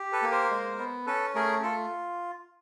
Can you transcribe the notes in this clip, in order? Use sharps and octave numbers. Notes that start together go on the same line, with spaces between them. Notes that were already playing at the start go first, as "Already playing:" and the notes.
Already playing: G4
A4 B4
A#3
A#4 C5
G#3
B3
C#4 A4 B4
A3 G#4 A#4
F4 A4